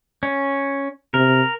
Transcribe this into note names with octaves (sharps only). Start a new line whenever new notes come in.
C#4
C3 A#4